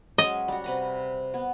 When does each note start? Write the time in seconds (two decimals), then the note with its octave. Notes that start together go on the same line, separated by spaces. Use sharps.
0.18 F#3 G#3 C#4 D#5
0.48 G3 F#4
0.64 C3 B4 A#5
1.34 B3